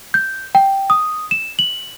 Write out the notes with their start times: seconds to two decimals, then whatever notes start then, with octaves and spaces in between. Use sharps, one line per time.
0.14 G6
0.55 G5
0.90 D#6
1.31 E7
1.59 F#7